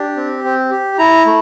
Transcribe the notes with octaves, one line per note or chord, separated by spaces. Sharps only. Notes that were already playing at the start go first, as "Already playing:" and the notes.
Already playing: D4 G4
C4
C4
G4
E4 A#5
A3